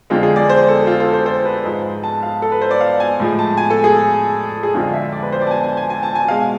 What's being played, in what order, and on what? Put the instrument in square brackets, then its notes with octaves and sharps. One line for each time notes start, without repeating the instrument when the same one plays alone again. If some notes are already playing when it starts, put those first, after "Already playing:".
[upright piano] F2 D3 G#3 F4
G#4
D5
C5
A4
F4
A4
C5
C5
B4
G#2 F3 G#3
A5
F5
A4
B4
C5
D5
F5
G#5
A2 F3 G#3
A5
G#5
A4
G#4
G#4
F2 D3 F3 G#3 F4
E5
D5
B4
C5
D5
A5
G#5
G#5
G#5
G#5
A5
G#5
B2 G#3 F5